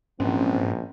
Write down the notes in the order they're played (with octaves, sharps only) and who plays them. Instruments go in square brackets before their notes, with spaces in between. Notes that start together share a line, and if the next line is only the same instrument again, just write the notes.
[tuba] A#1 [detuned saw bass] G#2 [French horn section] E3 C4 [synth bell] C#4